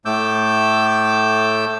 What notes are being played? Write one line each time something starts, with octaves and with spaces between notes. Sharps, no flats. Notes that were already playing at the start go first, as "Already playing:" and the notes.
A2 A3 D6 E6 G6